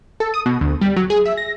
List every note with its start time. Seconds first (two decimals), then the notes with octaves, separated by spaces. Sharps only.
0.20 A4
0.34 D#6
0.46 B2
0.61 D2
0.81 G3
0.96 F#3
1.10 G#4
1.26 E5
1.37 A#6